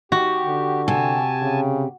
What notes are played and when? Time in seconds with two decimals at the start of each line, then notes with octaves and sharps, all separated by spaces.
0.12 F#4 G4
0.46 D3
0.88 C3 G4 G#5 A5
1.42 C#3